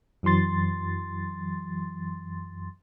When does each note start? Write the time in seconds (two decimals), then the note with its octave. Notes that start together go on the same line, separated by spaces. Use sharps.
0.23 F#2 E3 F#3 C6 A6